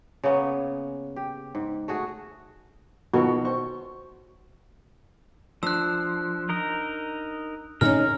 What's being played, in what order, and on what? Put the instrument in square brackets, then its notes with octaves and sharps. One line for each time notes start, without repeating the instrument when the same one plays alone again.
[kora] C#3 A#3 B3 C#4
G4
G#2
A3 F#4 G#4
[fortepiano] B2 D#3 F3 [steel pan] F#4
[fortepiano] C5 C#6
[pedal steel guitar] F3 [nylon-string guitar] D4 [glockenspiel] E6 F#6
[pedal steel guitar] D#4 A#4 D#5
[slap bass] A2 D3 C4 [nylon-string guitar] C#4 D#4 G#4 [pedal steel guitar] A#4 [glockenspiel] F6